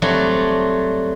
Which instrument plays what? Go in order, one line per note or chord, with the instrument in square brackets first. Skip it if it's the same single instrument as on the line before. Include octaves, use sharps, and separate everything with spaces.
[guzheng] F#3 G3 A3 C4